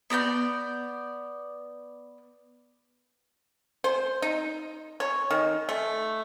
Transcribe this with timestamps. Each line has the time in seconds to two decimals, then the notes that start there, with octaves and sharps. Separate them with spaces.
0.10 B3 D5 A#5 G6
3.84 C5
4.22 D#4
5.00 C#5
5.31 D#3
5.69 A3